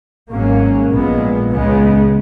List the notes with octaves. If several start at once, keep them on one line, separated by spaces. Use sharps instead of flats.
G#1 G#2 F#3 A#3 C#4
A#1 A#2 G#3 B3
C#2 C#3 G#3 B3